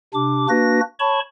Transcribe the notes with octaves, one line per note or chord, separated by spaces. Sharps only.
C3 D4 D6
A#3 D4 F#4 B4 A#6
C#5 A5 B5 C#6